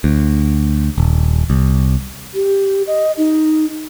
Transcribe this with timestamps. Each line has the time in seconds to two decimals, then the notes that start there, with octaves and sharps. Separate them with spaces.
0.04 D2
0.98 D#1
1.50 C2
2.34 G4
2.87 D#5
3.17 D#4